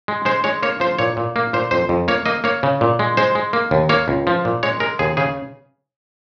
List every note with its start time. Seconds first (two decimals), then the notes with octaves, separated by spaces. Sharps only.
0.08 G#3
0.25 G#3 C5
0.44 G#3 C#5
0.63 A#3 C#5
0.80 F3 C5
0.99 A#2 C#5
1.17 A#2
1.36 A#3
1.53 A#2 C5
1.71 F2 C5
1.89 F2
2.08 A#3 C#5
2.26 A#3 D#5
2.44 A#3 C#5
2.63 C#3
2.81 A#2
2.99 G#3
3.17 G#3 C5
3.35 G#3
3.53 A#3
3.71 D#2
3.89 A#3 C#5
4.08 C#2
4.27 F3
4.45 A#2
4.63 G#3 C#5
4.80 G#3 A#4
4.99 D#2 G#4
5.17 C#3 G#4